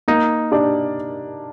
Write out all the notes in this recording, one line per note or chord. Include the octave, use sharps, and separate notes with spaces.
A#3 D#4
D4 G4 D5